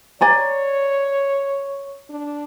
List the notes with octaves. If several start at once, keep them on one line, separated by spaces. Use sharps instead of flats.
C#5 D5 G#5 A#5
D4